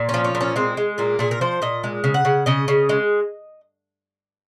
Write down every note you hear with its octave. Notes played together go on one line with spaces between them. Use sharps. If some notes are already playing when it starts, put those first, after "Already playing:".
Already playing: A#2
C#4
F3
C#4
A#2
C#4
G#3 C4
G#3
A#2 A#3
A#2 G#4
A#4
F3 C5
A#2 D#5
G#3
C#3
F#5
C#3
C#3 D#5
C#3
G#3